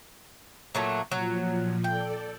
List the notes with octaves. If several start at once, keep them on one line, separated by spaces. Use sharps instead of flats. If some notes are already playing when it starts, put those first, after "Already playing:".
A#2 F#3 A3
A#2 F3 F#3
A4 D5 G5